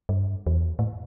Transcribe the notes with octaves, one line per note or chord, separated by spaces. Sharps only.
G2
E2
A2